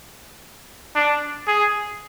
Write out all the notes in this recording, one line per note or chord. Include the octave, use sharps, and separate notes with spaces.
D4
G#4